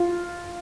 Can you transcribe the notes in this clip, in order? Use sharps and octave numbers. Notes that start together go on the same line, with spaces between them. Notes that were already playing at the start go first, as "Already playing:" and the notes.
Already playing: F4